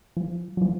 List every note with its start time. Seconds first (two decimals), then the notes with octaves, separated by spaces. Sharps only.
0.17 F3
0.57 F#3
0.62 F3